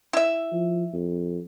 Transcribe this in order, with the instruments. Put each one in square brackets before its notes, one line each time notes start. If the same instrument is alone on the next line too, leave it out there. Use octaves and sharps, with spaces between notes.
[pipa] E4 E5
[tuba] F3
F2